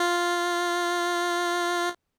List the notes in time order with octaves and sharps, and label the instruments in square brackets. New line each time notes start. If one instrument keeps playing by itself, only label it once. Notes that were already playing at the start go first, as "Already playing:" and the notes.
Already playing: [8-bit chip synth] F4